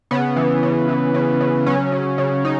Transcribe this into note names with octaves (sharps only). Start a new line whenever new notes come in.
C#3 B3
E3
C#3
E3
C#3
C#3
F#3 C#4
C#3
C#3
C#3 D#4